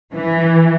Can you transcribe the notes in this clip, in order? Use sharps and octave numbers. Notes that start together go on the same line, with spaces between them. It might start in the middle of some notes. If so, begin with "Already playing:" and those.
E3